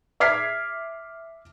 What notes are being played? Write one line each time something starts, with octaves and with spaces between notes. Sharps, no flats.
E5 D6 F6 G#6 B6 C7